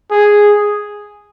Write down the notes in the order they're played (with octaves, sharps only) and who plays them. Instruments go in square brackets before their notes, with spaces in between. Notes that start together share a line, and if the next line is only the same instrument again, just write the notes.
[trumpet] G#4